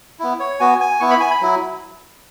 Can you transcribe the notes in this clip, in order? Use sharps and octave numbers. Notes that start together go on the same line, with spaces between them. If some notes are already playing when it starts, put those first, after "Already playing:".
B3 E4
C#5
B3 F#4 G#5
G#5
B3 E4 C#6
B5
G#5
B5
F#3 E4